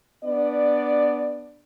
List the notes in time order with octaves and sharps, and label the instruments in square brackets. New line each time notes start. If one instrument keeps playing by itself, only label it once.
[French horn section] B3 D4 D5